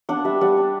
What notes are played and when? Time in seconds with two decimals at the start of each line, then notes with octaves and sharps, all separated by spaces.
0.09 D4 F#5
0.24 G3 E5
0.41 G3 F#5
0.57 D4